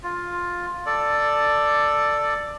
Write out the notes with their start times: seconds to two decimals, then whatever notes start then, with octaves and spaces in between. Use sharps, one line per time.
0.03 F4
0.86 A4 D5